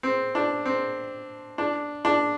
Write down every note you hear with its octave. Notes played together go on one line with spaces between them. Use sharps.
C4
D4
C4
D4
D4